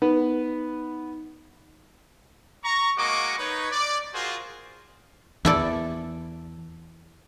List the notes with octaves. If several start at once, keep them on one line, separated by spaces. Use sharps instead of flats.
B3 D#4 B4
A#5 C#6
G#3 A#3 F#4 D#5 C#6 D6
D#4 B4 C#5
D5
F4 F#4 G#4 A#4 C5
E2 E4 A4 D5